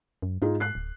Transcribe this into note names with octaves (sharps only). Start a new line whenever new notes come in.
F#2
G#2 D#4 F4 G#4
F#6 C7
D1